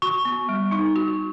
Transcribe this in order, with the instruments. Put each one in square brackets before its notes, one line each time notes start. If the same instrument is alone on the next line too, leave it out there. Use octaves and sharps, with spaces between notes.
[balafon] F#4 [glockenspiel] C#6
[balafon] B3
G3
[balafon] D#4 [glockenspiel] C#6
[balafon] F#4